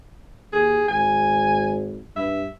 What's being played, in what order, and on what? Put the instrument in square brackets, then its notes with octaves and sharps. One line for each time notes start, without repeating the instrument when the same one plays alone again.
[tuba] D#2 [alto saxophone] G#4
[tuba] G#1 [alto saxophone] G#5
[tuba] G2 [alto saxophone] E5